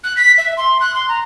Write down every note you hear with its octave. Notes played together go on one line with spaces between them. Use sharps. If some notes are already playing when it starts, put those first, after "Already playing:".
F#6
B6
E5
C6
F#6
C6
A#5